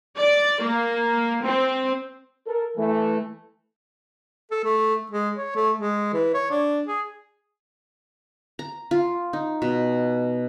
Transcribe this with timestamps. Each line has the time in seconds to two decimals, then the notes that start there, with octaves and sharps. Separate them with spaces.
0.18 D5
0.63 A#3
1.43 C4
2.47 A4 A#4
2.77 E3 A3
4.51 A4
4.64 A3
5.11 G#3
5.37 C#5
5.56 A3
5.77 G#3
6.13 E3
6.34 C#5
6.50 D4
6.87 G#4
8.59 A#5
8.91 F4
9.33 D#4
9.62 B2